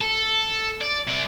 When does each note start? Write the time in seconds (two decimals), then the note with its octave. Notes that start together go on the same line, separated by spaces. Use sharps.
0.01 A4
0.81 D5
1.08 C3 D5